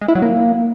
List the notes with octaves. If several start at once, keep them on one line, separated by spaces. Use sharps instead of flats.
G#3
E4
F#3
A#3